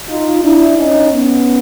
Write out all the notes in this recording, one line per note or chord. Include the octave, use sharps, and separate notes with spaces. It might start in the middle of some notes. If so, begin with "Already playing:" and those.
D#4 F4
D4 E4
C#4 D#4
B3 C#4